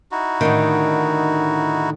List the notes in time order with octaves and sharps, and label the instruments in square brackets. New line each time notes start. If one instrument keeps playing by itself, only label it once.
[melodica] D#4 E4 F#4
[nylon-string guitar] A2 D3 D#3